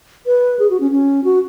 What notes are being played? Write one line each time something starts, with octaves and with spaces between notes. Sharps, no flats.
B4
G#4
F#4
C#4
C#4
F#4